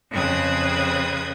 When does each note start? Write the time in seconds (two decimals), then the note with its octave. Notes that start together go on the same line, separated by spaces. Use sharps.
0.11 F2 C#3 C4 B4 D#6 G#6